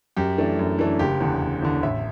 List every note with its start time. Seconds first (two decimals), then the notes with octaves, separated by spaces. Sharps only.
0.16 F#2 G4
0.38 E3 A3 D4
0.59 F#2
0.79 E3 A3 D4
0.99 F#1 G4
1.20 E2 D3
1.41 F#1
1.62 E2 D3
1.83 A1 E5